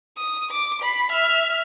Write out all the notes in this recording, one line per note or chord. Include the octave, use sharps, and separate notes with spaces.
D#6
D6
B5 C7
E5 F6